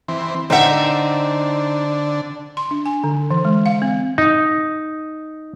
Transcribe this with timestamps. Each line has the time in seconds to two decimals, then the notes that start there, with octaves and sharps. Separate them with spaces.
0.08 E3 C4
0.50 D3 C4 D#4 E5 F#5
2.57 C6
2.71 D4
2.86 G#5
3.04 D3
3.31 E3
3.45 G#3
3.66 F5
3.82 C4
4.18 D#4